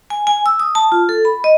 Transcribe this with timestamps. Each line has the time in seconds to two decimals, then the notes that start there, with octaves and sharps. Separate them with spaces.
0.10 G#5
0.27 G#5
0.46 E6
0.60 D#6
0.75 A5
0.92 F4
1.09 A4
1.25 B5
1.44 D#5